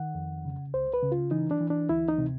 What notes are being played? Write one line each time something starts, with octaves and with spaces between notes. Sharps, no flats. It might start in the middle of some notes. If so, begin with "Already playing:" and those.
Already playing: D#3 F#5
F2
C#3
C#2 C5
B4
C#3
F4
E3 D#4
D4
E3
D4
D2 E4
D#4
C3